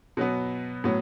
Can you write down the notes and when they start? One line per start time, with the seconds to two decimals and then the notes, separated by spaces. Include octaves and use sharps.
0.17 B2 F#3 B3
0.84 A2 F#3 B3